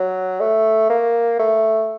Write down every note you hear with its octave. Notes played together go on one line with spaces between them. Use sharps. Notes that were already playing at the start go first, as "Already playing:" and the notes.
Already playing: F#3
A3
A#3
A3